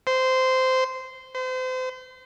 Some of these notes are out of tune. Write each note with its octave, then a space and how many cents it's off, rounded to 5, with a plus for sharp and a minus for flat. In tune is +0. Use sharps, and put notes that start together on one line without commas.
C5 -15
C5 -35